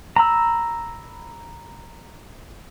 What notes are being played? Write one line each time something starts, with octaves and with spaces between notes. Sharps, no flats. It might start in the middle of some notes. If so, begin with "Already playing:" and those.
A#5 B5 E6